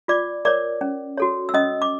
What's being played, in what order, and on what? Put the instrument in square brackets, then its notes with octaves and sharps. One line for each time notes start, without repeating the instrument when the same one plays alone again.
[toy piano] F4 D5 D6
A#4 C#5 D5 D6
C#4
F#4 A4 C#5
E6
C#4 D#5 D#6
D6